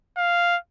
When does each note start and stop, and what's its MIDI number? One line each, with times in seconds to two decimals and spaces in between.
0.17 0.57 77